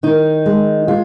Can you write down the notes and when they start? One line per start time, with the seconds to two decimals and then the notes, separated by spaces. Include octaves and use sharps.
0.03 D#3 D#4
0.46 G#3
0.88 G#3 F4